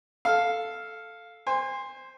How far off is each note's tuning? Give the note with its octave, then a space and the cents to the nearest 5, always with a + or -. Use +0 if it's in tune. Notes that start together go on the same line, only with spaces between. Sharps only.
A4 +0 F5 +0
C5 +0 G#5 -40